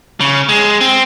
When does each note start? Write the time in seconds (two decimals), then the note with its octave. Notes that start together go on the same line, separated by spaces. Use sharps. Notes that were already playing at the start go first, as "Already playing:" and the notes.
0.20 C#3
0.49 G#3
0.81 C4